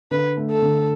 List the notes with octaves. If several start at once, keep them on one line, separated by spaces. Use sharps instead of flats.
D3 B4
A3
A4
D3